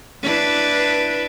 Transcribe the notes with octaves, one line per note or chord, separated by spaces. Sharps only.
D4 E4 B4